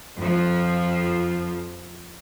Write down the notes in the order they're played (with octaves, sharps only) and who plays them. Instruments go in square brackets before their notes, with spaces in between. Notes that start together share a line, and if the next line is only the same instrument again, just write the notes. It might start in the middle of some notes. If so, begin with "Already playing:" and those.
[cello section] F2 F3